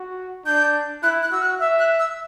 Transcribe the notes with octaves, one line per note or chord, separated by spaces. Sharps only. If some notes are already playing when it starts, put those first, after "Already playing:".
Already playing: F#4
D4 G6
E4 F#6
F#6
F#4 E6
F#6
E5 E6
F#6
E6